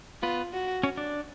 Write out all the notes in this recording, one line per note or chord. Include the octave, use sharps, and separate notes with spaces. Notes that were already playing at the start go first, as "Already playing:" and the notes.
B3 F4 B4
F#4
C#4 C#5
D4 D5